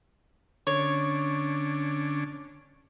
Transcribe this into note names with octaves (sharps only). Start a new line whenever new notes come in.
D3 C#4 D4 C#5